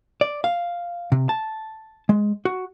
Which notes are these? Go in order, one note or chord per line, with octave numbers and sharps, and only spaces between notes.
D5
F5
C3
A5
G#3
F#4